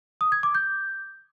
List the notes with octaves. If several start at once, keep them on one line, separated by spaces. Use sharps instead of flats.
D#6
G#6
D6
G6